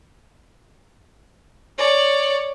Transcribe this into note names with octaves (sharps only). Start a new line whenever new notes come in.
C#5 D5